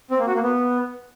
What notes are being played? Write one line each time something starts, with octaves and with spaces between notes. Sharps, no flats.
C4
A#3
F#4
A#3
B3